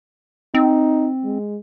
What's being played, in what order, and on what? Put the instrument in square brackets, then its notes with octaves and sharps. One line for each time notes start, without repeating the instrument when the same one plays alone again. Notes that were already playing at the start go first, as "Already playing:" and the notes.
[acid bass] C4 [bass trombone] D#4
[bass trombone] G#3